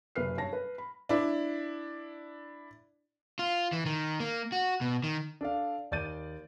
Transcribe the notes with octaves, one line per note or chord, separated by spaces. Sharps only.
F#1 C3 B4 F6 C7
G2 C#5 A5 A#6
B4
B5
D4 E4
F4
E3
D#3
A#3
F#4
B2
D#3
D4 A4 F5
D#2 D5 G6 A6 D#7